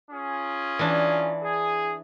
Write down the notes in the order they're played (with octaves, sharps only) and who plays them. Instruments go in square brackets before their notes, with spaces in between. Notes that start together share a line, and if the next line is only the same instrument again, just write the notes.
[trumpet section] C#4 F4 G#4
[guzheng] E3 D4
[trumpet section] G#4